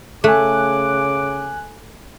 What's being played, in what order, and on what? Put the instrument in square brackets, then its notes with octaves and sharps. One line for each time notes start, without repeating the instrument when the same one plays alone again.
[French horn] C#3 [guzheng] A3 [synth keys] G#5 F#6 [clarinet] D6